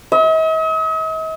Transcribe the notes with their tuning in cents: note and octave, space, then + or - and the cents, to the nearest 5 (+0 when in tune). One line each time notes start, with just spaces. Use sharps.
D#5 +45